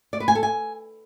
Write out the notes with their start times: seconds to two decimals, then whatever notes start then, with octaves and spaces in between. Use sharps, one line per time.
0.13 D5
0.20 B4
0.28 G#5
0.35 A4
0.43 G#5